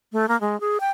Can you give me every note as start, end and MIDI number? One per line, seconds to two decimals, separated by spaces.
0.12 0.26 57
0.28 0.39 58
0.41 0.59 56
0.60 0.78 68
0.80 0.91 79